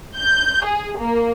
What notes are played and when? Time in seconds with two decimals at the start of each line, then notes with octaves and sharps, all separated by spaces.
0.17 G6
0.65 G#4
0.98 A#3